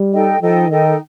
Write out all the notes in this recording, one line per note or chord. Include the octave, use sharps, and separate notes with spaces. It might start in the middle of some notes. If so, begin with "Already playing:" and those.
Already playing: G3
D#4 A4 D#5 G5
F3 D#4 A4 D#5 G5
D#3 D#4 A4 D#5 G5